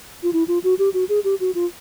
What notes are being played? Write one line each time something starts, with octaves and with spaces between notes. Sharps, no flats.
F4
E4
F4
F#4
G4
F#4
G#4
G4
F#4
F4